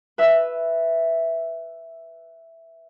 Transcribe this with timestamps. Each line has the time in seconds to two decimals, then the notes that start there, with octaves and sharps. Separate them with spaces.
0.18 B4 E5 E6